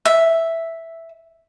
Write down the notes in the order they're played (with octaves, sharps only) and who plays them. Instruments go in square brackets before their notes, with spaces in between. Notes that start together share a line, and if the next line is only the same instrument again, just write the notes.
[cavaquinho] E5